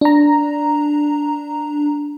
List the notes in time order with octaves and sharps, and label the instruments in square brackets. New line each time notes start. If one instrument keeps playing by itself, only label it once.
[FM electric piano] D4 A#5